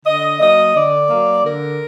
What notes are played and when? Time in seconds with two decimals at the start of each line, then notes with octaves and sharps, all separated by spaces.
0.06 D3 D#5
0.40 F#3 A#3 D#5
0.75 D3 D5
1.10 F#3 A#3
1.44 D3 A#4